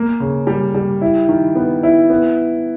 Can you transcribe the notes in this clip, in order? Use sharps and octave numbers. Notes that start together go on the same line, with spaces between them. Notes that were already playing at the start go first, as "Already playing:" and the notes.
Already playing: A#3
C#3
G3
G3
E4
D#3
B3
E4
B3